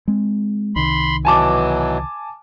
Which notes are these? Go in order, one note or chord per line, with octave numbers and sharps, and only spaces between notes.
G#3 C4
C2 D#3 B5 C6
B2 E3 F#3 G#5 A5 D6